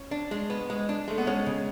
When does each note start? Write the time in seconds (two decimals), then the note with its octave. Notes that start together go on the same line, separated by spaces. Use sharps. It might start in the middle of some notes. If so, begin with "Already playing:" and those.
Already playing: C#4
0.11 D4
0.31 G#3
0.50 B3
0.70 G#3
0.89 D4
1.08 G#3 A3
1.18 B3
1.27 G#3 C#4
1.46 C#3